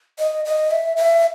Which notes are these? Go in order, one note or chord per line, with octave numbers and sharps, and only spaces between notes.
D#5
D#5
E5
E5